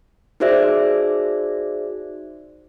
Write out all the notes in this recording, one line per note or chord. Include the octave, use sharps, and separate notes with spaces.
D#4 F#4 G#4 C5 D5 E5